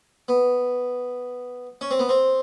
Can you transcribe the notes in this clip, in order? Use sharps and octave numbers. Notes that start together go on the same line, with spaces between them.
B3
C#4
C4
B3
C4